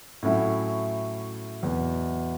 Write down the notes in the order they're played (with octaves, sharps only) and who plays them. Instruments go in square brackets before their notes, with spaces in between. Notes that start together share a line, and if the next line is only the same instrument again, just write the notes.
[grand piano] A2 F#3 C#4 E4
E2 B2 F#3